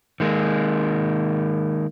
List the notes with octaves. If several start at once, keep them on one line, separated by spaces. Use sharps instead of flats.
D#3 G#3 A#3